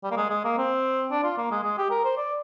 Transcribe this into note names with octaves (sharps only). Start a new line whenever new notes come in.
G3
A#3
G#3
G#3
A#3
C4
D4
F4
A#3
G#3
G#3
G4
A#4
C5
D5